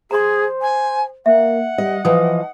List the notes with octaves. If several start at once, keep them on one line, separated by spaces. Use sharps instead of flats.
G#4 C5 A#5 C6
G#5
A#3 E5 F#5
G3 D#5
E3 F3 D#5 D#6